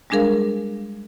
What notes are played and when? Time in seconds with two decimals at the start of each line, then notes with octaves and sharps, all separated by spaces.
0.10 G3 G#3 D4 G#4 A#4 F5